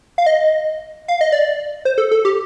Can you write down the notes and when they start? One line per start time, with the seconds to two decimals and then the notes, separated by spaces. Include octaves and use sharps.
0.18 F5
0.26 D#5
1.08 F5
1.21 D#5
1.32 D5
1.85 C5
1.98 A4
2.11 A4
2.25 G4